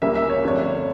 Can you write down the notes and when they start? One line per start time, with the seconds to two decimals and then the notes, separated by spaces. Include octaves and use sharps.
0.02 C#2 C#3 G3 A#3 E5
0.15 E5
0.30 C#5
0.44 G1 F2 D3 A3 D4 C#5